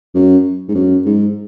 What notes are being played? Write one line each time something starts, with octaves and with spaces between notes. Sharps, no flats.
F#2
G#2
F#2
G#2